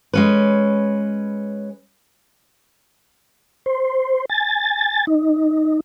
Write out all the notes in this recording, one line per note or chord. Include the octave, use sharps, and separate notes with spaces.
G#3 C#4 B4
C5
G#5 A6
D#4